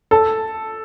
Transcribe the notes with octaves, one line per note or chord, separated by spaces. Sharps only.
A4